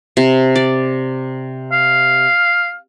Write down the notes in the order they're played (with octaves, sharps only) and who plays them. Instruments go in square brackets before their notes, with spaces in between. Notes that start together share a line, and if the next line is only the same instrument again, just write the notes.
[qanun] C3
D5
[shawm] F5